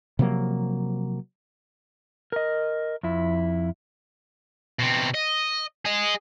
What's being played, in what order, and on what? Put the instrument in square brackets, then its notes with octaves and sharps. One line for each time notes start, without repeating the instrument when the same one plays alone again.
[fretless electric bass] C3 F3 F#3 A#3
[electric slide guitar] A#4 D#5
F2 E4
[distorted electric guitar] B2 C4
D#5
G#4 D#5